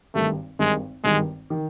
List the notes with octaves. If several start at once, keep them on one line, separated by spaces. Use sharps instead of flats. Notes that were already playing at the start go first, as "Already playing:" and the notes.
G#1 G2 D#3 A3
G#1 G2 D#3 G#3
G#1 G2 D#3 G#3
D#3